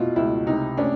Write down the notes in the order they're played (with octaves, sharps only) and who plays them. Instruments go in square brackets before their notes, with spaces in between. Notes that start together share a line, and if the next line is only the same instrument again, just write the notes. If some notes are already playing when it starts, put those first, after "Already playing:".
Already playing: [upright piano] B2 [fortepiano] E4 F4
[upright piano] C#2 [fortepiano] E4
[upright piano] C3 [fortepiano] D#4
[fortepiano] C#4 [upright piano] D4